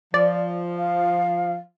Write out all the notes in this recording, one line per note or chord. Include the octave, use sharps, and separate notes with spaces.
F3 D5
F5